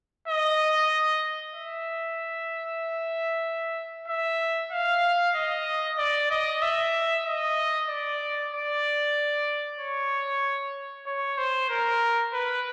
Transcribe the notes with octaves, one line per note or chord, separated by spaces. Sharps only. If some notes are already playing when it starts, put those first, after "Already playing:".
D#5
E5
E5
F5
D#5
D5
D#5
E5
D#5
D5
D5
C#5
C#5
C5
A#4
B4